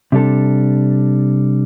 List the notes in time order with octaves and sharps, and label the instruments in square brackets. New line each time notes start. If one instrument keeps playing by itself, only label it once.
[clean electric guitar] C3 G3 D4 A4